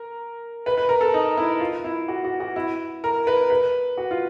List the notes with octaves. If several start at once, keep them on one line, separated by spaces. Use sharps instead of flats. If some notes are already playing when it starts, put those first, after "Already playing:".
Already playing: A#4
B4
B4
A#4
A4
D#4
E4
F4
E4
F#4
F#4
F#4
E4
A#4
B4
B4
F#4
F4